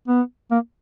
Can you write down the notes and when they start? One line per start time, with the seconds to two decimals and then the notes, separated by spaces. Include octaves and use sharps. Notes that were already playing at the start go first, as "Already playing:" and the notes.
0.08 B3
0.51 A#3